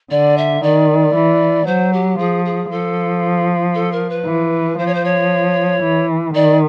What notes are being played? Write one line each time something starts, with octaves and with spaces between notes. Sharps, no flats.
D3 D5
E5
D#3 D5
E3
F#3 C5
G4
F3 G#4
G#4
F3 A4
A4
A#4
B4
E3
F3 C5
C#5
C5
C#5
E3
D#3 D5